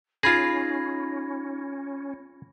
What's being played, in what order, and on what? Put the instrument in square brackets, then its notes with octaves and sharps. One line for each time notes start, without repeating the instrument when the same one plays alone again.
[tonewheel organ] C#4 [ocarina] D#4 [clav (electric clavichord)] F4 G#4 [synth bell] B5 G#6 A#6